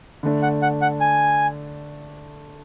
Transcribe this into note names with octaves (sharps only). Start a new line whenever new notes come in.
D3 A3 D4
F#5
F#5
F#5
G#5